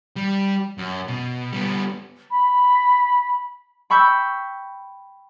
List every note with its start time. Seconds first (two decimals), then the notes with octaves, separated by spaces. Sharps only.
0.16 G3
0.78 F#2
1.08 B2
1.52 G3 B3
2.31 B5
3.90 G5 B5 C#6 E6 G6